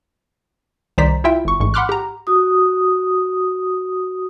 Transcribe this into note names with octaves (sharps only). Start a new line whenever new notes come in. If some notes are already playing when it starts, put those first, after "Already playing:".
C2 D#3 C5 D5 A#5 B6
E4 F4 E5 G5
G1 C#6
A1 G#2 C#6
F#5 B5 C6 D6 F6 F#6
G4 A#5
F#4 D#6